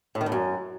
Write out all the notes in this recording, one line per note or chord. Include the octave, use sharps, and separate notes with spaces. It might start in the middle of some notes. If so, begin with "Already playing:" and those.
A2
D#3
A2
F#2